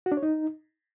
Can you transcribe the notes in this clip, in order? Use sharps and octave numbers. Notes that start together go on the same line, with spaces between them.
F#4
D4
C#5
D#4